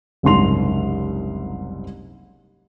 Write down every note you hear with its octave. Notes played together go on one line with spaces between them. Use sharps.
F#1 C2 G#2 C6 F7